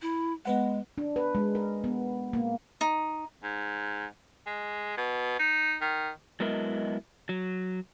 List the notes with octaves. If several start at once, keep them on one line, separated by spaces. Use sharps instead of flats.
E4
G#3 B3 B4 F#5
D4
B4
G#3
A#4
B3
A#3
D#4
G#2
G#3
B2
D#4
D#3
F#3 G#3 B3 E4 A#4 D#5
F#3